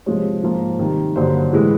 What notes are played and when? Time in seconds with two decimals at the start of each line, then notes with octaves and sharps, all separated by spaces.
0.06 C3 F3 G#3 C#5
0.43 G#2 F3 A#3
0.79 C3 D#3 G3
1.16 G2 D3 F#3 A#3 C5
1.52 A2 E3 G#3